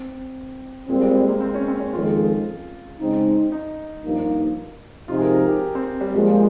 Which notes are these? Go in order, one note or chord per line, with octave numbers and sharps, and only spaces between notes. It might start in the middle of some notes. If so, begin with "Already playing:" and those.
Already playing: C4
A#2 G3 G#3 C4
G#3
G#3
A#3
C4
C#4
C4
C#4
F2 D#3 G#3 F4
C#3 G#3 C4 D#4
D#4
G2 F3 A#3 D#4
C3 F3 G#3 D#4 F4
G#4
A#4
A#4
G4
C4
G3
A#2 F3 G3 G#3